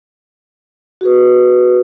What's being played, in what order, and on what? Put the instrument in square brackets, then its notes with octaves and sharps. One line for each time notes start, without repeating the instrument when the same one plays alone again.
[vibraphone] F#4 G#4 B4